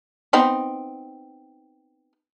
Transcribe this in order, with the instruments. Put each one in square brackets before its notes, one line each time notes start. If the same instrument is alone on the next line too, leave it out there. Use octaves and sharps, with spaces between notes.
[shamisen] B3 C4 D#4